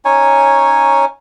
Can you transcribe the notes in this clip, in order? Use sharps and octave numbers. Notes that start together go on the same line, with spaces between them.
C#4 D#4 C#5 G#5